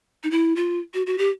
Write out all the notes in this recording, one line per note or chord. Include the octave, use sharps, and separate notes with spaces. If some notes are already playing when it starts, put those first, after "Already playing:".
D#4
E4
F4
F#4
F#4
G4